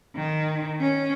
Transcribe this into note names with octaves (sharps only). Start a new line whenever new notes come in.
D#3
C#4